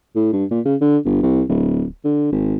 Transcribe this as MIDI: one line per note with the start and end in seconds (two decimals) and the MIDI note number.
0.16 0.32 45
0.33 0.45 43
0.51 0.60 46
0.65 0.76 49
0.81 0.98 50
1.05 1.18 31
1.23 1.43 36
1.49 1.86 26
2.05 2.31 50
2.32 2.57 32